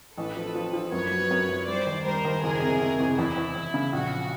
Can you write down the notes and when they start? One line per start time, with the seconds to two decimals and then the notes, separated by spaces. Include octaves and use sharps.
0.17 A1 A4 B4
0.37 F3
0.55 F3
0.73 F3
0.92 F#2 B4 C#5
1.11 F#3
1.31 F#2
1.49 F#2
1.68 G3 C5 D5
1.86 D#2
2.06 G3 A#4 C5
2.25 D#2
2.43 F#1 G#4 A#4
2.62 C3
2.80 C3
3.00 F#1
3.18 E2 E4
3.37 E2
3.56 E2
3.74 C#3
3.93 A#1 F#4